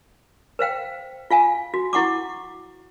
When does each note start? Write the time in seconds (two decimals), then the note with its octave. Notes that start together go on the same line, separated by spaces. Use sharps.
0.59 B4 C5 F5 G5
1.30 F4 F5 G#5
1.74 F#4
1.93 E4 F#5 C#6 D6